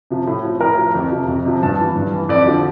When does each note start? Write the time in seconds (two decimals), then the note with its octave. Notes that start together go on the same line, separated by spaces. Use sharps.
0.10 C3 F3
0.27 A2
0.44 F3
0.61 A2 A#4
0.78 F3
0.95 F2
1.12 C3 F3
1.28 F2
1.45 C3 F3
1.63 G2 A5
1.79 E3
1.96 G2
2.13 E3
2.29 F2 D5
2.47 D3 F3